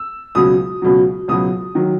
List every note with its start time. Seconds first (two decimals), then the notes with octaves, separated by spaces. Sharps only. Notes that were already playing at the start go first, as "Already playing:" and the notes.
Already playing: E6
0.35 C#2 B2 F#3 D#6
0.82 C#2 B2 F#3
1.28 C#2 B2 F#3 D#6
1.75 D#3 F#3